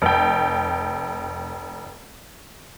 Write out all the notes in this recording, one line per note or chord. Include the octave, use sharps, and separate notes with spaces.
F1 G5